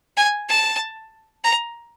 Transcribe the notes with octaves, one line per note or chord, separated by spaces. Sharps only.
G#5
A5
A#5